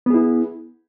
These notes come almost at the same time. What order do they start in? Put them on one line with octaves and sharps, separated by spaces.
B3 G#4 E4